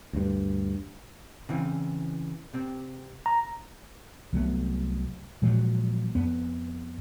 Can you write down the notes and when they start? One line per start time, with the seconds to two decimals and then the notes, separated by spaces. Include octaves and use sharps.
0.13 D2 G2
1.49 C#3 E3 C4
2.54 C3 C4
3.26 A#5
4.33 C2 F#3 A3 B3
5.42 A#2 F3 F#3 G#3
6.15 F2 B3